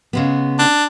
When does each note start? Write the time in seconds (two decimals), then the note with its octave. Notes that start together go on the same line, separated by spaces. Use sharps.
0.13 C#3 G#3 B3
0.59 D4